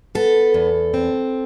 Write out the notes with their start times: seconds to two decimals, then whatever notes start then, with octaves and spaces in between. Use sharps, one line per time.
0.15 B3 A4
0.54 E2
0.94 C4